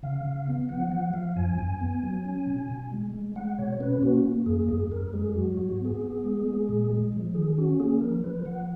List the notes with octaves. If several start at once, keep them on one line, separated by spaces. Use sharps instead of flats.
C#3 F5
C#3
B3
F3 F#5
F3 F#5
F3 F5
F#2 G#5
F#2
B3
F#3
C#4
B2
B2
G#3
G#3
G#3 F#5
B2 C#5
C#4 B4
A#3 F#4
A#3
F#2 G#4
F#2 G#4
F#2 A#4
G#3 G#4
F#3 F#4
G#2 F#4
F#4
B3 G#4
B3
G#3
G#3
A#2
G#3
F3
D#3 G#4
C#4 F#4
A#3 G#4
F3 A#4
F3 B4
F3 F#5